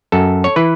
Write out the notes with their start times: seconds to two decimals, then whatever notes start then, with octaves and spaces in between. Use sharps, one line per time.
0.12 F#2 A4
0.44 C#5
0.56 E3 B4